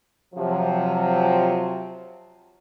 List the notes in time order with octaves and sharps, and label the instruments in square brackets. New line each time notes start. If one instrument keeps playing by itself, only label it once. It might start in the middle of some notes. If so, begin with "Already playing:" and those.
[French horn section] C3 F3 F#3